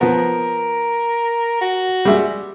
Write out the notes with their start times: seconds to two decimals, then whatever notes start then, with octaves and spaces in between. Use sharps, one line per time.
0.01 F3 B3 A#4
1.61 F#4
2.05 G3 G#3 E5